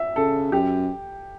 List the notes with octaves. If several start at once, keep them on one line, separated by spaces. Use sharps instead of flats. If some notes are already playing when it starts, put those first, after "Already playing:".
Already playing: E5
C#3 A4
F#2 G4